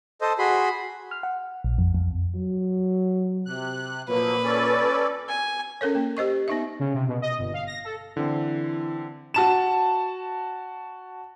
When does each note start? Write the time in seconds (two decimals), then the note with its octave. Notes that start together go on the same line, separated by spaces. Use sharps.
0.21 A4 C5 D#5
0.39 F#4 G#4 B5 C6
1.11 F6
1.23 F#5
1.64 A#1
1.78 F2
1.94 F2
2.35 F#3
3.46 C3 F#6
4.09 A#2 F3 F#3 A#3 B4
4.44 C#4 A4 D5
5.28 G#5
5.81 C#4 A4 A#4 C#5
5.95 A#3
6.17 G4 C5 D#5 C#6
6.48 B3 D#4 E5
6.79 C#3
6.94 C3
7.08 B2
7.22 D#5
7.38 G1
7.54 F5
7.67 A#6
7.84 A4
8.17 D3 E3 C4
9.34 F#4 A5 E7